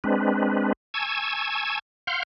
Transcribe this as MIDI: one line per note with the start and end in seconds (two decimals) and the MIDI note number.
0.04 0.73 56
0.04 0.73 60
0.04 0.73 62
0.04 0.73 71
0.94 1.79 80
0.94 1.79 81
0.94 1.79 85
0.94 1.79 88
0.94 1.79 92
2.07 2.23 77
2.07 2.23 78
2.07 2.23 84
2.07 2.23 89
2.07 2.23 91